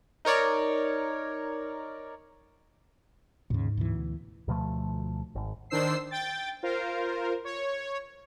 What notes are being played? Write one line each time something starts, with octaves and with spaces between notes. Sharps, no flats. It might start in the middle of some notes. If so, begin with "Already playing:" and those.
D#4 A#4 C#5 D5
D#2 G#2 C#3
D2 B2 E3
D2 B2 F3 A3
G#1
D#3 D4 C5 E6 C7
G5 A6
F4 A#4 C5
C#5